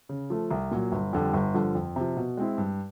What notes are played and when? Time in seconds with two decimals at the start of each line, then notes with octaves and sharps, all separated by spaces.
0.09 C#3
0.30 F3 A3
0.51 C2
0.71 A#2 F#3
0.92 G1
1.13 F2 D3 G3
1.34 G1
1.54 G2 D3 F3
1.75 F2
1.96 C3 F3
2.17 B2
2.37 G#3 C4 E4
2.58 G2